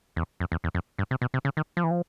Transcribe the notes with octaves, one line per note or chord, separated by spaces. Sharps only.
E2
F2
E2
E2
F2
G2
C3
B2
C3
C#3
D#3
F3
E3
F3